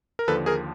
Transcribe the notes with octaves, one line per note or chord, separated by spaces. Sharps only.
A#4
D#2 D3 F3 A4 B4
G#4 A#4